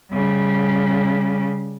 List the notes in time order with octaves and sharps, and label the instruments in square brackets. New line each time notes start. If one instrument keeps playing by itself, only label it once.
[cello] C#3 G3